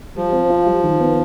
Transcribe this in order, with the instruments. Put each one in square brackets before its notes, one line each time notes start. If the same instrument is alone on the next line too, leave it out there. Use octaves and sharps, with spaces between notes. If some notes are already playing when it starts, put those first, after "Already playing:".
[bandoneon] F3 [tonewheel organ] G3
[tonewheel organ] C4
F4
G3
D#3
B3